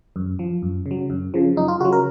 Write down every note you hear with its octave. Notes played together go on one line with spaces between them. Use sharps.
F#2
F3
F#2
C#3
F#3
F#2
C#3 F3
F#2 D#4
F4
C#3 F#3 F#4
A#4